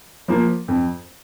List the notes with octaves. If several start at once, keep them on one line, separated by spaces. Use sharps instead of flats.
F3 A#3
F2